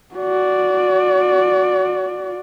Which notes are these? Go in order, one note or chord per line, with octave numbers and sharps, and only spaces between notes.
F#4 D5